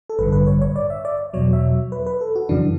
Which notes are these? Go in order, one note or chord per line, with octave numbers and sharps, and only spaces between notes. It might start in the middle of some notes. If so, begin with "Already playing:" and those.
A4
A1 G2 D3 B4
B4
C#5
C#5
D5
E5
D5
E2 B2 F#3 C#5
E5
B4
B4
A4
F#4
F#2 C#3 E3 D4